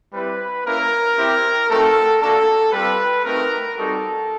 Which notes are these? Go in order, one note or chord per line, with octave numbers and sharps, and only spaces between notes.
G3 C4 E4 G4 B4
A#3 C#4 E4 A#4
C4 E4 G4
A3 C4 D#4 F#4 A4
A#3 D4 F#4 A4
G3 C4 F4 B4
A3 C4 D#4 F#4 A#4
G3 C4 D#4 F#4 A4